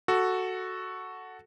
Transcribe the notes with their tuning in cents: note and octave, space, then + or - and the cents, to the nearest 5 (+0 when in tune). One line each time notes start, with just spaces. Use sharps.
F#4 +0 A4 +0